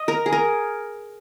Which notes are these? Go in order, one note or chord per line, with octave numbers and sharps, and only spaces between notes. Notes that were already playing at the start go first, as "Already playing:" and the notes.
Already playing: D#5
A#4
G#4
A#4